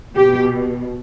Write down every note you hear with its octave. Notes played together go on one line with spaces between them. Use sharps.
B2 G4